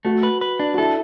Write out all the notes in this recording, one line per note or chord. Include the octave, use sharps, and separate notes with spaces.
A3 F#4
B4
B4
D4
F#4
E4 A4